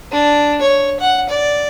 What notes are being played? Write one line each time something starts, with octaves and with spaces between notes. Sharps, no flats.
D4
C#5
F#5
D5